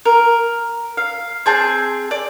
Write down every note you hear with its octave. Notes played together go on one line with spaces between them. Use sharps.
A#4
F5
C4 G#4 A5 G6
D5